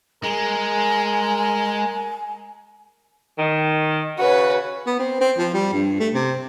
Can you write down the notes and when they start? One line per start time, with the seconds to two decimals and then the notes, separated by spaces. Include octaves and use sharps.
0.24 G#3 A#4 G#5
3.39 D#3
4.19 C#3 F#4 B4 C#5
4.87 B3
4.99 C4
5.21 C4
5.38 F3
5.54 G3
5.74 G2
6.00 A3
6.14 C3